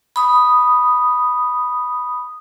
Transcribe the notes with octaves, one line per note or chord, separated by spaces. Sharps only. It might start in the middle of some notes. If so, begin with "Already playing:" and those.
B5 D#6